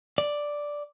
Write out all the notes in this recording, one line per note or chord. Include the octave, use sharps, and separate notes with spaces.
D5